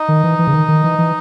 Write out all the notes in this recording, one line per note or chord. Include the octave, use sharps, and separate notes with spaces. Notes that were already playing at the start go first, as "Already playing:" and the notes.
Already playing: D#4 D#5
D#3
E3
E3
C#3
D#3
D#3
E3
E3